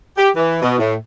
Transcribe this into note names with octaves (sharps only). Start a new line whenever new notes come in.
G4
E3
B2
A2